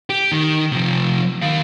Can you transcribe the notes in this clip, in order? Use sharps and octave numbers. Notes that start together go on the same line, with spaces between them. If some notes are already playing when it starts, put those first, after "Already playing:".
G4
D#3
C3 F3
D#3 F5